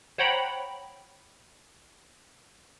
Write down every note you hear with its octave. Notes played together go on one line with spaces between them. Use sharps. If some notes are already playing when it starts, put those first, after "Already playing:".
C5 C#5 F#5 G5 A#5 B5